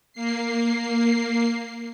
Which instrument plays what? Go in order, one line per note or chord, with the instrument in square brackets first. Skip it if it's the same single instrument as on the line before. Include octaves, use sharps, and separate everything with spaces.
[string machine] A#3 C7